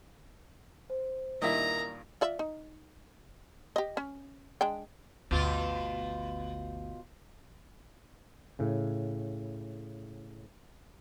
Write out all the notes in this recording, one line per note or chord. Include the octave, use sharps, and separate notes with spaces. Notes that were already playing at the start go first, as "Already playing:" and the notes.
C5
G2 A#2 D#3 E4 A#4 D#5 A#5
F4 D5 E5
D#4
G4 D#5
C#4
G#3 D4 G5
G1 D2 B2 F4
A2 C#3